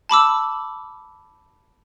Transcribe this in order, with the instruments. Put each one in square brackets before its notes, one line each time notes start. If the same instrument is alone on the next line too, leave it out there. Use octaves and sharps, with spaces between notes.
[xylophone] A5 B5 D6 E6